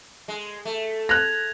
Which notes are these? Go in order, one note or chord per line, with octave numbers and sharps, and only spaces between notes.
G#3
A3
F#6 G#6 A#6 F7